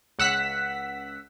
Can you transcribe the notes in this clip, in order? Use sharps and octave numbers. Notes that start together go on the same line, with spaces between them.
C#2 F#5 E6 B6